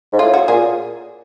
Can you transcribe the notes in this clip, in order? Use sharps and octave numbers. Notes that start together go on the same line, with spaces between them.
G#2
A2 F4
F#4
A#2 G#4